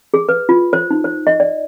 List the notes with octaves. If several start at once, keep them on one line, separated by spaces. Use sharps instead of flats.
G#4
B4
F4
C5
D#4
C5
D#5
D5